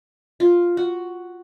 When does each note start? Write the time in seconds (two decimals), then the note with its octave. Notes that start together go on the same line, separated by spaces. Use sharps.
0.40 F4
0.77 F#4